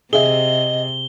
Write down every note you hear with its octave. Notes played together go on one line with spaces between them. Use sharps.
C3 G#4 D#5 E5 G7